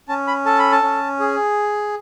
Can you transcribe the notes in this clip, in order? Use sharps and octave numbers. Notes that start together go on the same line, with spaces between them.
C#4 A5
B5
A4 A5
B5
A5
C#4
G#4